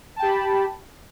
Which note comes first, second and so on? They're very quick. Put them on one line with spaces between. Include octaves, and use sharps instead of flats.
A5 G5 G4 B5